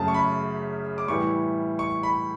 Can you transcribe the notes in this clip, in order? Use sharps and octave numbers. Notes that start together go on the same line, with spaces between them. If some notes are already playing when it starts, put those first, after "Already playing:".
Already playing: F#2 C#3 F#3 A3 A5
C#6
B5
D6
A2 E3 G3 C#6
C#6
B5